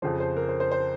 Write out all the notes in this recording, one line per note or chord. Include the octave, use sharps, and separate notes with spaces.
F2 C#3 F3 C5
C5
A#4
C5
C5
C5